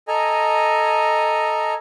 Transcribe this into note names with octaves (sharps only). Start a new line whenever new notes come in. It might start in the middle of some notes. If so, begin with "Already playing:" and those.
A4 D#5 G#5 A#5